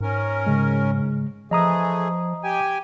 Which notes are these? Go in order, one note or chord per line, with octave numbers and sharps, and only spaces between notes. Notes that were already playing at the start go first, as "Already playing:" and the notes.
G#2 C#4 A#4
C#3 G#3
E3 F3 A3 G#4 D#5 A#5 D#6
G4 G5 G#5